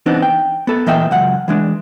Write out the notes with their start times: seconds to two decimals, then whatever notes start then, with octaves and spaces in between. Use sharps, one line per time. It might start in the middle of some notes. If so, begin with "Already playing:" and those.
0.06 E3 B3 C4 D4 D#4
0.22 G5
0.67 B3 A4
0.86 A#2 E3 D#5 E5 G5
1.11 C#2 F#2 F#5
1.48 E3 G#3 D4